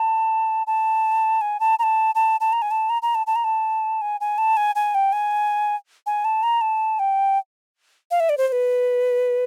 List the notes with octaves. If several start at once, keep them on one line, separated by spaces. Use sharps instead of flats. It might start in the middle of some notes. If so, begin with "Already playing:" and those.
Already playing: A5
A5
G#5
A5
A#5
A5
A5
A5
A#5
G#5
A5
A#5
A#5
A5
A5
A#5
A5
G#5
G#5
A5
G#5
G#5
G5
G#5
G#5
A5
A#5
A5
G5
F5
E5
D5
C5
C5
B4